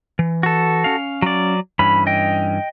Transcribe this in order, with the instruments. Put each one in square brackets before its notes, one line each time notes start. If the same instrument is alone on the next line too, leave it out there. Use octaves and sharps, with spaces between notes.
[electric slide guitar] E3
[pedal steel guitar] F#4 A4
[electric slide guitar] C#4 F5
[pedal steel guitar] F#3 D5
[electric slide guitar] G2 E3 C#4 [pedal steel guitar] B5
[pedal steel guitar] D#5 G5